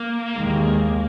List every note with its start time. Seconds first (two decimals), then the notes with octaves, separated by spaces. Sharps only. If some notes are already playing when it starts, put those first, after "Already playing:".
Already playing: A#3
0.35 D#2 D#3 G#3